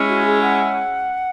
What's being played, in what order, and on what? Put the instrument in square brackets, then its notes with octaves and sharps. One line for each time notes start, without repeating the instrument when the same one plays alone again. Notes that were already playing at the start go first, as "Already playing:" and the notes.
Already playing: [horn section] G#3 C#4 E4
[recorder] F#4
G#4
F#5